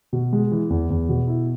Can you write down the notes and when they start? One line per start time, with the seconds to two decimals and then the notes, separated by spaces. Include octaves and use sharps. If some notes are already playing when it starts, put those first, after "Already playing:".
0.13 B2
0.33 G#3
0.51 E3
0.70 E2
0.90 E2
1.09 B2
1.28 E4